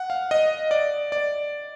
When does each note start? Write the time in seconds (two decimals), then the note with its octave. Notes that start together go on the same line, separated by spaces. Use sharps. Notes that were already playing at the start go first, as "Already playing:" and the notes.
Already playing: F#5
0.10 F5
0.31 D#5
0.71 D5
1.12 D5